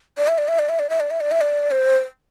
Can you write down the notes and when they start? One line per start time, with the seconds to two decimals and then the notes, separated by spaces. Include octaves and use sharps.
0.17 D5
0.28 E5
0.38 D5
0.48 E5
0.59 D5
0.69 E5
0.79 D5
0.90 E5
1.00 D5
1.11 E5
1.21 D5
1.31 E5
1.41 D5
1.71 C5